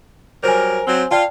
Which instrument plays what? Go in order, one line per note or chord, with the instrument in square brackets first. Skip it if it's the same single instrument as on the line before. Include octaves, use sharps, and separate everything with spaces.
[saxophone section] F#3 G3 A#4 [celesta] C5 G#5
[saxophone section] F#3 C4
[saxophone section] F4 F5 [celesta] D5 G5 A5